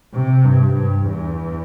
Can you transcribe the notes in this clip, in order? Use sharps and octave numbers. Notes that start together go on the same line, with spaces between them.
C3
G2
G2
E2